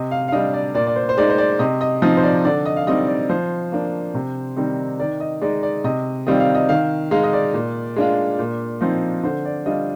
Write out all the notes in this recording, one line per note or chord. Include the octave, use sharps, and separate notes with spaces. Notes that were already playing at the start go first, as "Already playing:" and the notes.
Already playing: C3 D#5
F5
F5
G3 D4 D#5
D5
A#2 D5
D5
C5
C5
G#3 D#4 D5
C5
D5
C3 D#5
D#5
F3 C4 D#4 D#5
C5
D5
D3 D5
D#5
F5
G3 C4 D#4 D#5
D5
F3 C5
A#3 D4
C3
D#3 G3 C4 D#4
D#3 D5
D#5
G#3 D#4 D5
D5
C3 D#5
D#3 G3 C4 F4 D#5
F5
D#5
D#3 F5
G#3 D#4 F5
D#5
D5
A#2
G#3 D4 F4
A#2
F3 C4 D#4
D3 C5
D5
G3 D4 F4 D#5